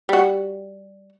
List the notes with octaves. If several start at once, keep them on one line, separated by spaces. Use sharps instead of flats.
G3 F#4